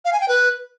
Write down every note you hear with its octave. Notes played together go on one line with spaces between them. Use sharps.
F5
G#5
G5
B4